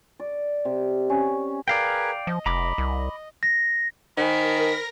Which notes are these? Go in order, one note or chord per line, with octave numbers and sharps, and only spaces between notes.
D5
C3
C#4
G#4 A#4 B4 D5 F5 G5
F3 D#5
F1 A#5 B5 D6
C2
A#6
D#3 A#4 C5 G#5 A#5 B5